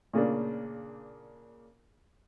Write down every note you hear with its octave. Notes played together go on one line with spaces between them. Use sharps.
A#2 C#3 A#3 D4